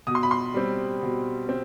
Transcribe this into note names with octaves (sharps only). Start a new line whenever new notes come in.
B2 D#6
C6
B5
C6
G3 C4
B2
C4